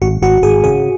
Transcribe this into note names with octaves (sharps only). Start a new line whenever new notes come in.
G#1 F#4
G#1 F#4
G#1 G#4
C#3 G#4